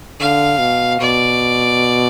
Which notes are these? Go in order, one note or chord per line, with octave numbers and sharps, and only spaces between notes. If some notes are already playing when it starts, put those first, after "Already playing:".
D3 F5
B2
B2 D5